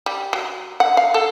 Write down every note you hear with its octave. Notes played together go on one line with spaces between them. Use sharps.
G3
F#3
F#5
F5
A4